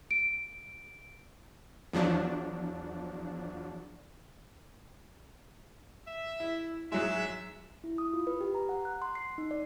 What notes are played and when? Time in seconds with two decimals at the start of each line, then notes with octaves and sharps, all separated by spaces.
0.11 D7
1.93 E2 F3 F#3 D4
6.07 E5
6.40 E4
6.92 G#2 F#3 G#3 E5
7.84 E4
7.98 D#6
8.13 F4
8.27 B4
8.41 G4
8.55 A#5
8.69 F#5
8.85 F#6
9.02 C6
9.15 C7
9.38 D#4
9.51 D5